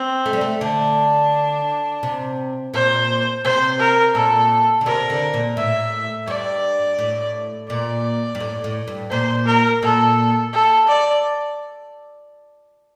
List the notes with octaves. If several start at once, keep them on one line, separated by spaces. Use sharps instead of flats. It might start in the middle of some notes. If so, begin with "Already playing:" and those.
Already playing: C4
A3
G3
A3
D3 D4
C3
A#2 C5
C3 C5
A#4
A#2 A4
D3
C3 A#4
D3
A#2
A2 E5
G2 D5
A2
A#2 D5
G2
A2
A2
G2
A#2 C5
A#4
A#2 A4
A4
D5